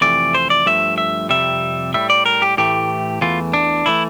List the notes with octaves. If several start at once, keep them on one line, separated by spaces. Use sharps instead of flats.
F2 C3 E3 A3 D5
C5
D5
G2 F3 A3 E5
E5
F2 C3 G3 E5
A2 G3 E5
D5
A#4
G4
A2 E3 A3 G4
E2 E3 A3 F4
D4
E3 A3 E4